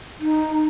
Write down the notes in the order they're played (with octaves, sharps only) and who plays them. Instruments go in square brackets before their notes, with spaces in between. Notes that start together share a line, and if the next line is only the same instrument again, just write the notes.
[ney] D#4